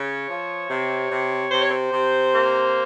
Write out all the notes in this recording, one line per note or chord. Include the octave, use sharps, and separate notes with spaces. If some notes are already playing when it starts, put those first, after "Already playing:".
Already playing: C#3 C#5
F3
C3
C3
C3 C5
C#5
C5
C3
A#3